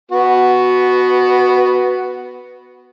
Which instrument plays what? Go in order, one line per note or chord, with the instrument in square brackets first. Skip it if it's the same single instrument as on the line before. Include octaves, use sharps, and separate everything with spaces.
[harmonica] B3 F#4